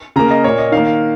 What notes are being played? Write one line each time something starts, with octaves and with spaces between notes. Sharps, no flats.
C#3 A#3 A#5
D#5
A#2 A#3 C#5
D#5
D#3 A#3 F5
F5